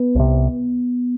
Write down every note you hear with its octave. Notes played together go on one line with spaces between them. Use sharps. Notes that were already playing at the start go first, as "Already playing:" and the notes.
Already playing: B3
C2 C3